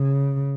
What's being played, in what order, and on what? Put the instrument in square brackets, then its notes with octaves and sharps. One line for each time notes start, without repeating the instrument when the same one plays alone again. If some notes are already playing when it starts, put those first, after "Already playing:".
Already playing: [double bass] C#3